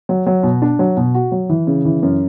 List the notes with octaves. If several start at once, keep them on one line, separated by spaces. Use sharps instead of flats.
F#3
F#3
B2
D4
F#3
B2
F#4
F#3
E3
C#3
E3
F#2